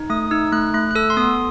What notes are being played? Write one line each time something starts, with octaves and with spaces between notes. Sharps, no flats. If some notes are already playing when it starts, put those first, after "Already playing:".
Already playing: D#4
A3 D#6
D#4 E6
A3 F#6
A3 F#6
F#6
A4 E6
C6
B3 D#6